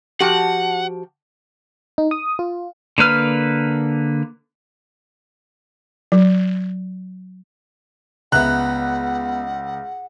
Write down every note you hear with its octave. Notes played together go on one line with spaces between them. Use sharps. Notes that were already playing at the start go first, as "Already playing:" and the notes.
F3 F#4 G4 F#5
D#4
D#6
F4
D3 A#3 B4 F6
F#3
C#2 B3 E5 F#5 A#5 F#6